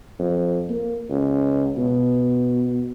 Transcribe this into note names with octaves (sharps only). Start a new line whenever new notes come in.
F2
A#3
C#2
B2